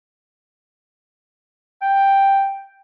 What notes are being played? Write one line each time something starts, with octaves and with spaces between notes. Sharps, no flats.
G5